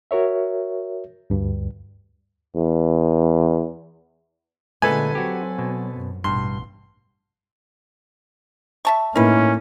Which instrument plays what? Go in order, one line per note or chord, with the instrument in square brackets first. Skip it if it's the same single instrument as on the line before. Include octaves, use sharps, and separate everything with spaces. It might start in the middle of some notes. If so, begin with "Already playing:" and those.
[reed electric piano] F#4 A#4 C#5 E5
D2 G2
[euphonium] E2
[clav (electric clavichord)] A#2 G#3 A3 [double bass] D3 C#4 [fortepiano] A4 B4 G#5
[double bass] F#3 C4 [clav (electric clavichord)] F#4 G4
[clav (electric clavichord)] B2
[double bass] F#2
[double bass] A1 B2 [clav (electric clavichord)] G2 [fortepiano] C6
[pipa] E5 A5 C#6
[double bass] A2 A#3 [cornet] C#4 [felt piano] D#4 E4 [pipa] A#4 B4